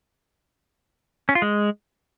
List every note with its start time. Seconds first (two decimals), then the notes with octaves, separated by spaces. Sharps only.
1.29 C#4
1.35 F4
1.42 G#3